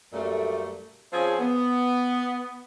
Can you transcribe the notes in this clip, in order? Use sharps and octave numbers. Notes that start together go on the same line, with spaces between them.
F#2 A#2 G3 A3
F3 C4 C#4 G#4
B3